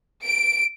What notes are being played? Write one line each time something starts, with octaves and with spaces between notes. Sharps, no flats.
D7